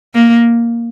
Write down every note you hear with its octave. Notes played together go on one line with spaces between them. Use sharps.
A#3